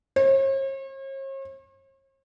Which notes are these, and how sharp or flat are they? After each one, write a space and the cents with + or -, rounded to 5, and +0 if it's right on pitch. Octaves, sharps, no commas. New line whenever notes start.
C#5 -45